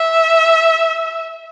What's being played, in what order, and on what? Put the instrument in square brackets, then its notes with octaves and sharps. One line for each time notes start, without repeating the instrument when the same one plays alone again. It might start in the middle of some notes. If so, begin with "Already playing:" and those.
Already playing: [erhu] E5